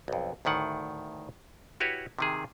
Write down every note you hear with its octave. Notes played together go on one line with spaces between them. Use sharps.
B1 F2
D2 A2 D#3 F#5
E4 F#4 G4 B4 C#5
C3 D#3 G#4